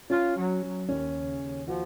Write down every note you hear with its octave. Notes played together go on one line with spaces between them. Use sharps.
C#4 F4
F#3
F#3
D#2 C#4
C#3
D#2
F3 F#4